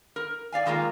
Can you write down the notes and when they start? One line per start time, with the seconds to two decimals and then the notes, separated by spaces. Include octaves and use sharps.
0.16 A#4
0.52 D5 F5 G#5
0.66 D#3 G#3 A#3 F4 A#4